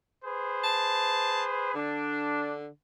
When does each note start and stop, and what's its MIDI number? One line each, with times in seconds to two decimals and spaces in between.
0.24 1.72 68
0.24 1.72 71
0.24 1.72 72
0.64 1.42 81
1.75 2.68 50
1.75 2.55 62